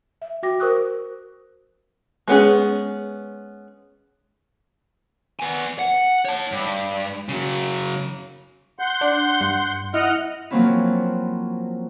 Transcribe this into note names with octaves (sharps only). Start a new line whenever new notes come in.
E5
F#4 G5 D6 A#6
A#4 C5 C#6 D#6 E6 F#6
G#3 B3 C#4 G#4
B3 G#5
F#5
C#5 A5
G2
C#3 F#3
F#5 C6 G6
D4
G2
E4 D#5 F#5 F6
F3 F#3 A#3 C4 C#4 E4